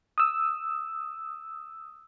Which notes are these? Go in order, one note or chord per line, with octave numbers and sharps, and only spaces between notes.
D#6 E6